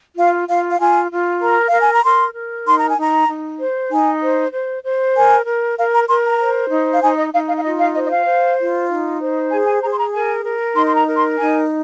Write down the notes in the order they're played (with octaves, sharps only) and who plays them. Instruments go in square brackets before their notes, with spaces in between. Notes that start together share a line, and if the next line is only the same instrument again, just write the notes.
[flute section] F4 F5
F4 F5
F5
F4 G#5
F4
A#4 A#5
F5
A#4
G#5
A#5
A#4 C6
A#4
D#4 C6
A#5
G#5
D#4 A#5
D#4
C5
D#4 G#5
C5
C5
C5
A#4 G#5
A#4
A#4 F5
A#5
A#4 C6
A#5
C5
D#4
F5
D#4 G#5
D#5
D#4 F5
F5
F5
F4 D#5
F5
C5 D#5
D#5
F5
C5
F4
D#4
C5
G#4 G#5
G#5
G#4 A#5
C6
A#5
A#4 G#5
A#4
D#4 C6
C6
A#5
A#4
C6
D#4 G#5